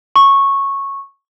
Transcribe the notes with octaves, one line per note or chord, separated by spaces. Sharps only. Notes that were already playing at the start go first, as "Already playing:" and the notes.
C#6